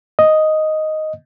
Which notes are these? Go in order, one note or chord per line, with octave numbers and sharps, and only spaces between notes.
D#5